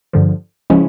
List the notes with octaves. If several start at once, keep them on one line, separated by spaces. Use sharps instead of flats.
G2 D3 F3
C#3 F3 G#3 C#4 E4